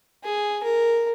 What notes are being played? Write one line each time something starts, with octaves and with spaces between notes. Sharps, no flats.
G#4
A#4